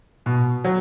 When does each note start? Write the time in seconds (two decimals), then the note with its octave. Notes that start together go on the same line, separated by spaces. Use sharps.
0.26 B2
0.64 F#3